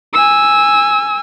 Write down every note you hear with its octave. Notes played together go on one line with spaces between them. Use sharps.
G#5 E6